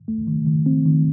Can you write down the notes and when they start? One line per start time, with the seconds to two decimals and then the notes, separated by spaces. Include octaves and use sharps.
0.08 A3
0.27 D#3
0.47 D#3
0.66 C4
0.86 D#3